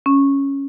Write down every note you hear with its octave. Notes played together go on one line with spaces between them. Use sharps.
C#4